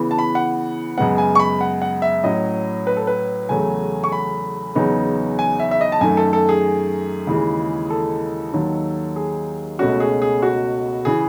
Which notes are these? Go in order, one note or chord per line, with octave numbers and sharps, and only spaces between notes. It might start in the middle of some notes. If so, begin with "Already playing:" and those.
Already playing: C#3 E3 B3
A5
B5
F#5
F#2 C#3 G#3 B3 F#5
G#5
C#6
B5
F#5
F#5
E5
A2 F#3 C#4 D#5
B4
A4
B4
E2 C#3 F#3 A3 G#5
C#6
B5
E2 C#3 F#3 B3 D#4
G#5
E5
E5
D#5
A5
F#2 D#3 A3 G#5
A4
A4
G#4
D#2 C#3 E3 G#3
A4
D#2 D#3 F#3
G#4
C#2 B2 A3 C#4 F#4
G#4
G#4
F#4
C#3 E3 G#4